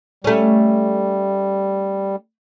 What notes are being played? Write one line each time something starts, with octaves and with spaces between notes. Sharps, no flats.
G3 A3 C#4